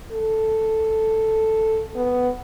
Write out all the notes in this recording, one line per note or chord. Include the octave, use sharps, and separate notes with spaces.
A4
B3